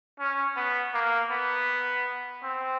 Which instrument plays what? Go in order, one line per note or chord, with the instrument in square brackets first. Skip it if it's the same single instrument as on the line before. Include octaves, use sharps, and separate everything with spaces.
[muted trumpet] C#4
B3
A#3
B3
C4